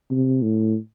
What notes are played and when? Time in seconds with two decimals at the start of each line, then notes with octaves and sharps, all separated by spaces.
0.10 C3
0.42 A2